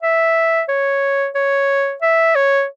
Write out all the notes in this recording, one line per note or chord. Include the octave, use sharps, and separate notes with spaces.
E5
C#5
C#5
E5
C#5